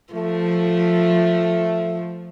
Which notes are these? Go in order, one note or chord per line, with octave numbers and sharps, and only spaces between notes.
F3 A3